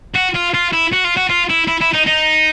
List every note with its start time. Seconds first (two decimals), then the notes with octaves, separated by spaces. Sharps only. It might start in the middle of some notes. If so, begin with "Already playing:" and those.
0.15 F#4
0.35 F4
0.54 F4
0.73 E4
0.92 F#4
1.04 F4
1.17 F#4
1.29 F4
1.49 E4
1.67 E4
1.81 E4
1.93 D#4
2.06 D#4